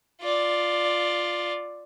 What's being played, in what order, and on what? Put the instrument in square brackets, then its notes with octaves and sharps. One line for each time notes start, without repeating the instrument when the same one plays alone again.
[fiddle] F4 D5